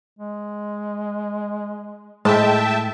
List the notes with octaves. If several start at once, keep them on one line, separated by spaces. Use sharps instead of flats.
G#3
A2 G#3 E5 G5 A5